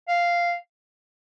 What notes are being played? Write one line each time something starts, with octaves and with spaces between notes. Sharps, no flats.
F5